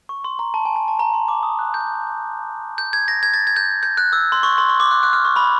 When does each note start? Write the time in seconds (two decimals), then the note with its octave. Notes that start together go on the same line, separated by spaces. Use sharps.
0.09 C#6
0.24 C6
0.39 A#5
0.54 A5
0.65 G#5
0.76 A5
0.88 A5
0.99 A#5
1.14 C6
1.28 D6
1.43 D#6
1.59 F#6
1.74 G6
2.78 G6
2.93 G#6
3.08 A#6
3.23 G#6
3.34 A6
3.47 G#6
3.56 G6
3.83 G6
3.97 F#6
4.13 E6
4.32 C6
4.43 C#6
4.58 C6
4.69 C#6
4.80 D6
4.91 F#6
5.03 F#6
5.13 F6
5.25 C#6
5.36 B5